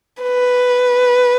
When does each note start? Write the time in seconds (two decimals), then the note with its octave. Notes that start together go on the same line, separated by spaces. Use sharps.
0.22 B4